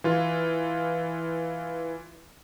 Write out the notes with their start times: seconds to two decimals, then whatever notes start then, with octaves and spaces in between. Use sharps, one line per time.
0.04 E3 F4